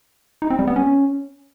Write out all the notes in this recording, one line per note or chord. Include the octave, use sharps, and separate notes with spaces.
D#4
C4
G3
B3
C#4